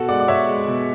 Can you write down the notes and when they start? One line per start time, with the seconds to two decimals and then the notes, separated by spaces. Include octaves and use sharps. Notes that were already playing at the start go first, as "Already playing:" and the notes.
Already playing: B2 F#4 A4
0.09 G#3 D5 F#5
0.20 D5
0.28 B2 C#5 E5
0.49 G#3
0.68 B2